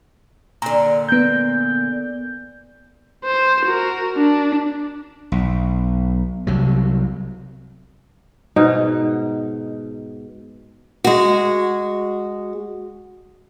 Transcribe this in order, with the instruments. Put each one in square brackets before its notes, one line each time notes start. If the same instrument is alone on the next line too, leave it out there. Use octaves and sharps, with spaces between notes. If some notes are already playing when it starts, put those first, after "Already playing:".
[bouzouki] A#2 D3 [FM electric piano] A#5
[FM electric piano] B3 G6
[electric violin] C5
F#4 A#4
D4
[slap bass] B1
C2 C3 F#3
[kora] G#2 B2 D#4
[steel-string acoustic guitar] G#3 F#4